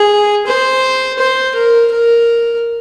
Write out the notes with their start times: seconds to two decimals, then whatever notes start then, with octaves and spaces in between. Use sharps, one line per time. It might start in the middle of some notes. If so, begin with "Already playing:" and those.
Already playing: G#4
0.47 C5
1.19 C5
1.55 A#4
1.92 A#4